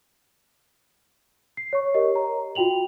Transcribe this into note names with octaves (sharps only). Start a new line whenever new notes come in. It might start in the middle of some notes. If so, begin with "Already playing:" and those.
C7
C#5 C#6
G4 A#4 C#5 D#5
A#5
F4 F#4 G5 F7 F#7